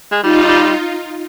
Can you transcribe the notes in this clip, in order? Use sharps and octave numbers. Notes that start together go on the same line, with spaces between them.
G#3
G3 D#4 F4
G3
G3